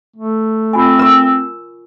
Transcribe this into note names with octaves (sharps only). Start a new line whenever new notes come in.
A3
C4 F4 G#5
A#4 C#6 E6